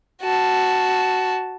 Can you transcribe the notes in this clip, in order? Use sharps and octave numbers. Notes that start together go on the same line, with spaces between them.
F#4 A5